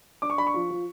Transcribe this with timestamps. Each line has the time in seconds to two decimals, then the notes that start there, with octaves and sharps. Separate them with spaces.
0.22 D4 D6
0.30 C#6
0.38 D4 B5
0.47 C#6
0.54 F3
0.70 F3